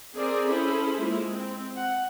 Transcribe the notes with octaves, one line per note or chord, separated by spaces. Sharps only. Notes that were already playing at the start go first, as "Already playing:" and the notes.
C4 G#4 A#4 C5 D5
C#4 E4 G#4 A4 C5 B5
G#3 A#3 E4 F4
C4
F#5